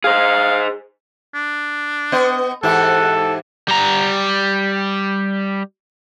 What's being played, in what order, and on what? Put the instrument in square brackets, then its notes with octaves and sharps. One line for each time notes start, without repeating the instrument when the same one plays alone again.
[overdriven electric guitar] G#4 C5 [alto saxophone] F5
[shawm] D4
[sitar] B3 D#5
[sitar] G#2 E3 G4 [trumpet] A4 [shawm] F#5
[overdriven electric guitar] G3 A#5